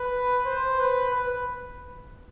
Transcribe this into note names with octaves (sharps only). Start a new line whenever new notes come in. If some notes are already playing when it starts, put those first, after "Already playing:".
Already playing: B4
C5
B4
B4